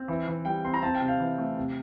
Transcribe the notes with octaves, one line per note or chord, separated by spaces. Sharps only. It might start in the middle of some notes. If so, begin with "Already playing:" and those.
Already playing: C4
E3
E3
G3 G5
C4 C6
A#5
C4 A5
G5
C3
F5
E3
A3
C3